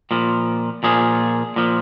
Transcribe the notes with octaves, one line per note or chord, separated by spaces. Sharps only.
A#2 F3
A#2 F3 G#4
A#2 F3